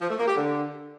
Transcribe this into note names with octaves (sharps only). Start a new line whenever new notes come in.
F3
A3
A#3
G4
D3